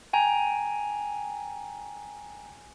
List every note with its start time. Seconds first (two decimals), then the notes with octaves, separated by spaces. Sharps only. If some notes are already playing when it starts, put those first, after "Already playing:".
0.13 G5 G#5 A#5